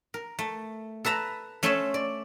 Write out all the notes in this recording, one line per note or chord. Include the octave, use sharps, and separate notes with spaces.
A#4
A3
A4 B4 E5 A#5
A3 C#4 A4 C5 C#5 E5
D5